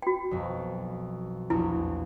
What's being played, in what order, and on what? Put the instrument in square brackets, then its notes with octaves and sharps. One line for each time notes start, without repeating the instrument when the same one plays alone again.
[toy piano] F#4 G5
[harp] B1 F2
[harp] A#1 E2 [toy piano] E4